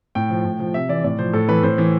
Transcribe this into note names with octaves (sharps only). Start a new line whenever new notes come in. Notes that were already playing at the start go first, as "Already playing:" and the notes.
A2 G5
F3
A2
F3
C3 E5
E3 D5
A2 D5
F3 C5
A2 A4
E3 B4
A2 C5
E3